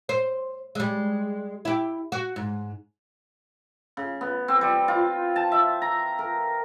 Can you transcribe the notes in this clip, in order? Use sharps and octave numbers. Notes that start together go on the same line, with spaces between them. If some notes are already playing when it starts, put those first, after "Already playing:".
C5
G3 G#3
E4 G4
F#4
G#2
C#3
B3
C4
G3
F4
A5
E5
A#5
A#4